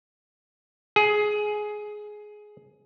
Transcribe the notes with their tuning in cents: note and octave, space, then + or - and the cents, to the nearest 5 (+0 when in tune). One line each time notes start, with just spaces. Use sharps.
G#4 +15